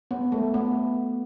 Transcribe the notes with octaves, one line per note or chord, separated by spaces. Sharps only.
B3
A3
B3